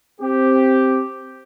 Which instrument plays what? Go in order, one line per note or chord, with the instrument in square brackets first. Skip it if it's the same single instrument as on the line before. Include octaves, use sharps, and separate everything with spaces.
[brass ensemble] C4 G4